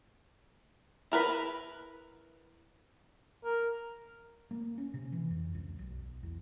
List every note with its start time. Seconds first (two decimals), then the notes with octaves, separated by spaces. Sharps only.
1.12 E4 A#4 B4 B5
3.44 A#4
4.51 A#3
4.78 C#4
4.94 C3
5.12 E3
5.30 F2
5.55 C#2
5.79 B1
6.23 E2